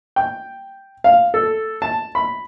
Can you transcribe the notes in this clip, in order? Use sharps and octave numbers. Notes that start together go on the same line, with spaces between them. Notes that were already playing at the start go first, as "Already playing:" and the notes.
G5
F5
A4
A5
B5